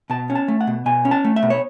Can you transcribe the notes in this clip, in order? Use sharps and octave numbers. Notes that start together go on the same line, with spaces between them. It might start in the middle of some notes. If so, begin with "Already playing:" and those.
B2 A5
C#4
A5
A3
F#5
B2
B2 G#5
C#4
A5
A3
E5
B2
C#5